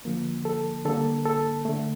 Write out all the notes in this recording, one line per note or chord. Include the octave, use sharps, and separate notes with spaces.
D3 F3 A#3
A4
D3 G3 A#3 A4
A4
D3 A3